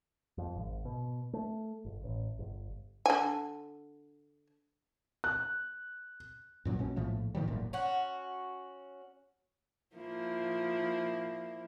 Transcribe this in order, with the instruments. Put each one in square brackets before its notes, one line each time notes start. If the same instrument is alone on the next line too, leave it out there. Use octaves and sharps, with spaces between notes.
[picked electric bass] F2
G#1
B2
A3
G1
A1
G1
[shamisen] D3 G#5
[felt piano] F#6
[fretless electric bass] F#2 A#2 F#3
A#1 B2 C#4
A#1 A2 F3 A3
A2 D#3 F3 G3
E1 A1 F#2 A#2
[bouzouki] C#4 F#4
[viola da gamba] F3 A#3 E4